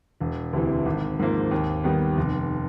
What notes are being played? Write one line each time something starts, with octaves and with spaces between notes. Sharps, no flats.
E1
D2 C3 E3
G#1
G#2 F3 A#3
D#2
D#3 G3 B3
F1